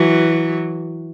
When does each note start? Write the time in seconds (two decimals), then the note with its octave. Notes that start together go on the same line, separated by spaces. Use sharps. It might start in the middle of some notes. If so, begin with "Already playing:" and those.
Already playing: E3 F#3